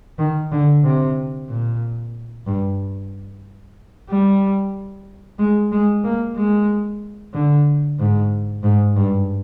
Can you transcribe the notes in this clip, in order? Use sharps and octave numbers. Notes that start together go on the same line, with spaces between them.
D#3
D3
C3
A#2
G2
G3
G#3
G#3
A#3
G#3
D3
G#2
G#2
G2